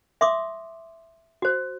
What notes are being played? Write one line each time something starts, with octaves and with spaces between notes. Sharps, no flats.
E5 C6 D6 D#6
F#4 C5